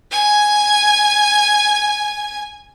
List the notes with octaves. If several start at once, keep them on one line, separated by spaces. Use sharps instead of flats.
G#5 G#6